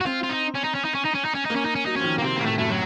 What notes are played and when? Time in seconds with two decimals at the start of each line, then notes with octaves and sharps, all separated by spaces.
0.01 F#4
0.06 C4 F4
0.23 F4
0.29 D#4
0.55 C#4
0.64 D#4
0.75 C#4
0.84 D#4
0.94 C#4
1.05 D#4
1.14 C#4
1.25 D#4
1.34 C#4
1.45 A#3 D#4
1.55 C#4
1.65 D#4
1.75 C#4
1.86 F#3 D#4
1.96 F3 C#4
2.04 D#3
2.18 A#3
2.22 C3 C4
2.37 A2 A#3
2.46 A3
2.58 F#2 A3
2.70 F#3